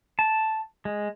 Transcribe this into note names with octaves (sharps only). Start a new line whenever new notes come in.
A5
G#3